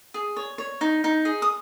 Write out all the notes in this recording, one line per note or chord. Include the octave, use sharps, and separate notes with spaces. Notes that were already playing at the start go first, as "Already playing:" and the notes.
G#4
C#5
C#5
D#4
D#4
G#4
D#6